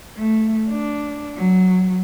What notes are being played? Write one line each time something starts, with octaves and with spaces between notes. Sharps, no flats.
A3
D4
F#3